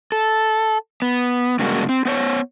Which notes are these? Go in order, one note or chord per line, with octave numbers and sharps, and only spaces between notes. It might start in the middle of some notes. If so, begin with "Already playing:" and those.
A4
B3
G2 C#3 G#3 A#3 D4 F#4
C4
B3 C5 C#5